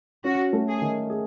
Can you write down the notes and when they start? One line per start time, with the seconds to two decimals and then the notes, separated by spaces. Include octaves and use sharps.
0.25 C#4 F#4
0.53 A3
0.68 G#4
0.82 D#3
1.10 G#4